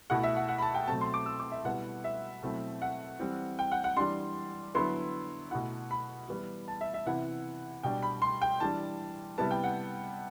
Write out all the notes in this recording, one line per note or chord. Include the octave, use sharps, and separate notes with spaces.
B2 A3 E4 F#5
E5
F#5
F#5
B5
A5
G5
B2 F#3 A3 C4 A5
C6
D6
E6
D6
E5
B2 G3 B3 E4 F#5
E5
B2 F#3 A3 C4 E4
F#5
E3 G3 C4
G5
F#5
F#5
E3 G3 D4 C6
D3 F#3 B3 E4 C6
B2 A3 E4 F#5
B5
E3 G3 B3 E4
A5
E5
E5
C3 E3 B3 E4 F#5
B2 G3 D4 G5
B5
C6
G5
E3 G3 D4 A5
C3 G3 B3 E4 A5
G5
F#5